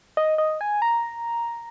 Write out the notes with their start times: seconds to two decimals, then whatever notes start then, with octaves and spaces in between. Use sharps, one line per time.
0.17 D#5
0.38 D#5
0.61 G#5
0.82 A#5